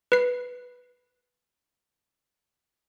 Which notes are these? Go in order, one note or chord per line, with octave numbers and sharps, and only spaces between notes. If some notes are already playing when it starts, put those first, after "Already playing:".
B4 C7